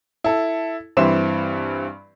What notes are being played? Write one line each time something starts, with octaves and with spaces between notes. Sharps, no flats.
E4 A4
G2 E3 C4 E5 C6 E7